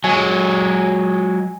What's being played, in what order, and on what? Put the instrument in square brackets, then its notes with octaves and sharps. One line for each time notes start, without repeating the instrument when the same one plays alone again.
[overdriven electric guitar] F#3 G#3 [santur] G#5